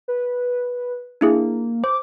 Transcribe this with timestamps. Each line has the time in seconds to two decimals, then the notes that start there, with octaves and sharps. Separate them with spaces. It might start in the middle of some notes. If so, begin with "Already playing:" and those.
0.08 B4
1.21 A#3 D4 E4 G#4
1.84 C5 D6